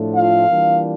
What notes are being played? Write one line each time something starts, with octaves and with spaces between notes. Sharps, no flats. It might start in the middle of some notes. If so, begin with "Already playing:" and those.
Already playing: A2 F3 A3 D4
F4 F5
E3 G3 A#3 D4 F4